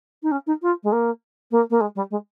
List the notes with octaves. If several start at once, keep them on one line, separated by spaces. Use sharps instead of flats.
D#4
C#4
D#4
F4
G#3
A#3
A#3
A#3
G#3
G3
G#3